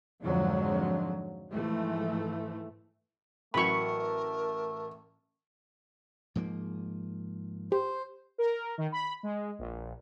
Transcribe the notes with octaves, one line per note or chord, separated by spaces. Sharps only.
F2 G#2 D3 F3 F#3 G#3
G#2 E3 F3 A3
A1 F#3 A3 A#4 B5 C#6
G#2 F3 A#3
G4 C5
A#4
D#3
B5
G#3
A#1